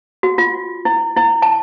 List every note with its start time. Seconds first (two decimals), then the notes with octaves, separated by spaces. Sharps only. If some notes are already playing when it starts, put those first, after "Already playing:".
0.23 F#4
0.38 F4
0.85 E4
1.17 E4
1.42 A5